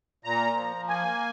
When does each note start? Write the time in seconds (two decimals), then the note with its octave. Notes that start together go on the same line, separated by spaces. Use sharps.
0.24 A#2 A#5
0.56 F3
0.88 A#3 G#5